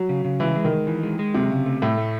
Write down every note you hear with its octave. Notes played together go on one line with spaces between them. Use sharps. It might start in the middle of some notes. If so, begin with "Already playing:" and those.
Already playing: F#3
C#3
C#3
E3 G#3
G#3
D#3
G#3
E3
G#3
G#3
C3 F#3
C#3
A3
A2 A3
A3